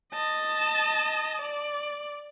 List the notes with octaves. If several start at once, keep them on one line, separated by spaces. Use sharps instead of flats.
D#5 A5
D5